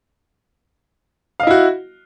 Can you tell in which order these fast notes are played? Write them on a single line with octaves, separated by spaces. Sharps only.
F5 D#5 E4 F#4